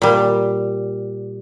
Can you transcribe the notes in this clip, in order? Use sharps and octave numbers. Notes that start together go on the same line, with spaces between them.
A#2 G3